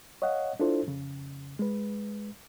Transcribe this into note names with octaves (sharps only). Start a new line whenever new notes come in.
C#5 D#5 F5 F#5
D4 E4 F4 A4 C5
F2 C#3
G#3 B4